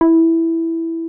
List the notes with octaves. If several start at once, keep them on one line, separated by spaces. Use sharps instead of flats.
E4